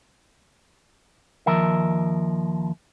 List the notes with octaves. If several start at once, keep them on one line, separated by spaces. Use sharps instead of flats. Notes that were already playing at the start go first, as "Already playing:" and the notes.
D#2 F3 A#4 E5